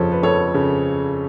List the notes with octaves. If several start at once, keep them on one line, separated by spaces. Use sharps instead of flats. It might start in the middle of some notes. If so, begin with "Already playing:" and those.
Already playing: F2 C#3 F3 A4 C#5
B4
F2 A4 C#5
C#3